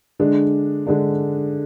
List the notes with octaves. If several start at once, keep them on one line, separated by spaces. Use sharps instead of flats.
D3 G#3 D4
D3 G#3 D4